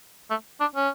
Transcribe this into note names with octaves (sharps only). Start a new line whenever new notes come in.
A3
D4
C#4